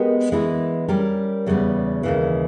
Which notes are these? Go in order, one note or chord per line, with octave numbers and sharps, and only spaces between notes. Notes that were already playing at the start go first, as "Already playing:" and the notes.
Already playing: G#3 B3 G4 A#4 D#5
E3 G#3 B3 E4
G3 C#4 G4 A#4
E2 C#3 G3 B3
D#2 C#3 E3